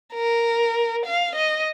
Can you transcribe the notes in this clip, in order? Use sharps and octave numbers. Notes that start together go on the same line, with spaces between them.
A#4
F5
D#5